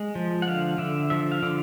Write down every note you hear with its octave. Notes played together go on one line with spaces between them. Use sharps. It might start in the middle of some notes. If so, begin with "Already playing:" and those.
Already playing: G#3
F3
F#5
D3 F5
D3 E5
F3 E5
F5
D3